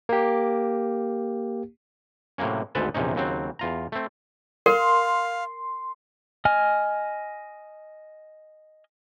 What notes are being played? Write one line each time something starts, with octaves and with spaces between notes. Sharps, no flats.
A#3 G4
A2 C3 F#3 A#3 C#4
G#1 D2 G#2 A4 B4 A5
A#1 E2 C3 C#4 D#4
D#2 C#3 F#3 C4
E2 F4 A#5
A3 C4
A#4 F5 C6
D#5 G#5 F6